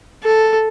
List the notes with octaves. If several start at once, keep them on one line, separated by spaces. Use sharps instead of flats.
A4